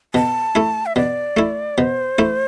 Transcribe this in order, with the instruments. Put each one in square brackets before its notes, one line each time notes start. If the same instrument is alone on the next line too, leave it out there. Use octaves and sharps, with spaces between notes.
[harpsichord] B2 [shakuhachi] A5
[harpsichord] A3 E4
[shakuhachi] E5
[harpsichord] B2 [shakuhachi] D5
[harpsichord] A3 E4
[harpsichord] B2 [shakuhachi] C5
[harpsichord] A3 E4